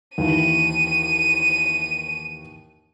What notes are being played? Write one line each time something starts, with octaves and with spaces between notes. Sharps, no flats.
D#2 E3 D#7